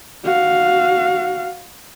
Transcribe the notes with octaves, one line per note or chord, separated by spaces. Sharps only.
F#4 F5